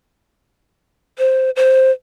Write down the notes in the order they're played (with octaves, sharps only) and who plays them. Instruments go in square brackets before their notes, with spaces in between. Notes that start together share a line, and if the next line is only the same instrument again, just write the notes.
[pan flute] C5
C5